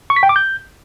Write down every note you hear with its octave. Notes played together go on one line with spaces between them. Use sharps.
C#6
B6
G5
D6
G6